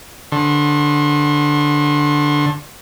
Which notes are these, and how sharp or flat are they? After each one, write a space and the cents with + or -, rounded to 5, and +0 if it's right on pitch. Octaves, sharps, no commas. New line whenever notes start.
D3 +0 C6 +45